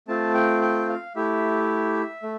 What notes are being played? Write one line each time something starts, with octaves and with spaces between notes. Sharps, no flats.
A3 C4 F4 A5
G5
G5
F5
A3 E4 G4 E5
A3